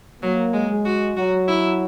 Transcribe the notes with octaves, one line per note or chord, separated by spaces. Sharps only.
F#3 A#3
G#3
G#3
F#4
F#3 F#4
E4